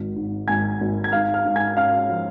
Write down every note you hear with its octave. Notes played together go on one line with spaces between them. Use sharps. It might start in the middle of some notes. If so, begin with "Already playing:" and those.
Already playing: G#1
G#2
G#1 G#5 G#6
G#1
G#6
G#2 F5 F6
F5 F6
G#2
G#5 G#6
C#4 F5 F6
F3